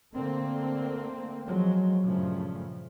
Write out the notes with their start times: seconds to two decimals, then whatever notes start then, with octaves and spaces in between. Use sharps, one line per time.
0.14 D3 A3 A#3 C4
1.45 F3 F#3 G#3
2.05 G2 A#2 C#3 F3 A3